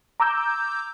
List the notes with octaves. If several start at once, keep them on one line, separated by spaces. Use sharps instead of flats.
A#5 D6 E6 G6